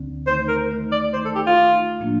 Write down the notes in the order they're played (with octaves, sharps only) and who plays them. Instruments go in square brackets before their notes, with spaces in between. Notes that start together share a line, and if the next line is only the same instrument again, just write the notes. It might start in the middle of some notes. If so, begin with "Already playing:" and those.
Already playing: [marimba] D2 D3 C4
[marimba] D#3 A3 D#4 [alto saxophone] C5
[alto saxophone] A#4
[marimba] D#3 A3 D#4
[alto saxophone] D5
[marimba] D#3 A3 D#4 [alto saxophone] C5
[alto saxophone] A4
G4
F4
[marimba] D#3 A3 D#4
A2 F3 A#3 D4 F4